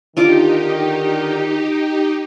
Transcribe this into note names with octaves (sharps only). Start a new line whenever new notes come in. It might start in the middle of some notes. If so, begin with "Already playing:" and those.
D3 D#3 D4 D#4 F4 G4 D6